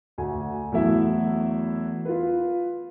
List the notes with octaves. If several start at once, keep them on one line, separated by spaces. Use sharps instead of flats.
D2 F#4 G#5
E2 F#3 A3 B3 E4 E5
F4 B4